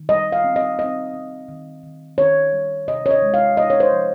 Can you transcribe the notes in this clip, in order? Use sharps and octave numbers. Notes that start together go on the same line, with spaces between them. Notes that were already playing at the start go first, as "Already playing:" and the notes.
Already playing: D#3
G3 D#5
F5
C4
D#5
C4 D#5
C4
D#3
D#3
D#3 C#5
G3
C3 D#5
C#5
D#5
G#3
F5
C3 D#5
C#5
C5
F3